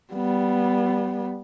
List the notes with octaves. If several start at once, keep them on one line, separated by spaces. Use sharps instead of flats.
G3 B3